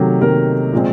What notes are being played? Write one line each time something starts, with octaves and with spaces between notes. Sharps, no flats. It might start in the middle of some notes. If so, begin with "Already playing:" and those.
Already playing: C3 D#3 F#3 A3
C3 D#3 F#3 A3 A#4
A#2 F3 G#3 C4